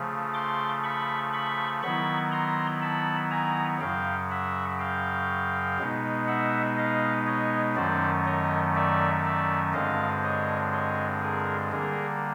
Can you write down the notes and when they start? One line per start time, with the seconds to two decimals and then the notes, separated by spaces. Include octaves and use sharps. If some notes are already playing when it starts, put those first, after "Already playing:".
Already playing: C#3 F3 A3
0.34 C6 D6
0.83 B5 C#6
1.33 B5 C#6
1.83 D#3 F#3 B3 E4 B5 C#6
2.32 A#5 C6
2.82 A5 B5
3.31 G#5 A#5
3.80 F#2 C#3 F#3 F5 G5
4.30 E5 F#5
4.79 F5 G5
5.79 B2 G#3 B3 D#4
6.27 E5 F#5
6.77 D#5 F5
7.26 C#5 D#5
7.76 F#2 D#3 F#3 A3 C#4 C5 D5
8.26 C#5 D#5
8.75 D5 E5
9.24 D5 E5
9.73 G2 D3 F3 G#3 C4 D#5 F5
10.23 C#5 D#5
10.72 C#5 D#5
11.22 G#4 A#4
11.72 D3 G3 A#3 G#4 A#4